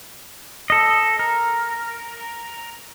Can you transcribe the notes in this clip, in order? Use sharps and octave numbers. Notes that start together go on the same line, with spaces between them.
A4 D#5
A#4